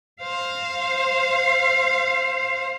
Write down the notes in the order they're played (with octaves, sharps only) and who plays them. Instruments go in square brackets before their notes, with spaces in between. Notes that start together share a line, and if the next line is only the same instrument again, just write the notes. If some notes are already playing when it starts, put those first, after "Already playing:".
[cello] C5 F5